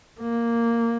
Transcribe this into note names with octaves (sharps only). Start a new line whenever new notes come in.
A#3